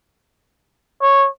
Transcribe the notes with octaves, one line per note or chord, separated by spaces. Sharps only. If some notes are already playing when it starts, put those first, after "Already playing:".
C#5